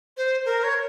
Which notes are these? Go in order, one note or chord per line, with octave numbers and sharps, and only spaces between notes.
C5
A#4
C#5